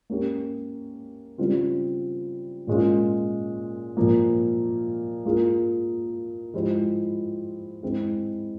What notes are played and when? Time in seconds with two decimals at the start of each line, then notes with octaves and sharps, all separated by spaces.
0.10 A#3 C#4 G4
1.38 C#3 G3 C4 F4
2.67 A#2 G#3 C#4 F4
3.97 A#2 F3 A#3
5.25 A#3 F4 G#4
6.54 F3 G#3 E4 G4 C5
7.83 G#3 C4 E4